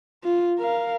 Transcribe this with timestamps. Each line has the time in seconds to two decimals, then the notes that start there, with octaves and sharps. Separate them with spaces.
0.24 F4
0.58 A#4 F5